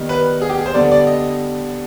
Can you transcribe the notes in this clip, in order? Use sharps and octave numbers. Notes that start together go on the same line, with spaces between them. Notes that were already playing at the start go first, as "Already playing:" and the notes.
Already playing: D#3 G3 B3
B4
G#4
G4
G#4
C5
D3 G3 B3 D5
D5
D#5